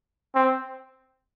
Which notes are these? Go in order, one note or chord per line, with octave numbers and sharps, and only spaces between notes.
C4